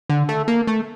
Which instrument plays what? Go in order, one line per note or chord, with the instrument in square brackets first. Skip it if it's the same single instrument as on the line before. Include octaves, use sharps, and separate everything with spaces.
[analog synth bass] D3
A3
A#3
A3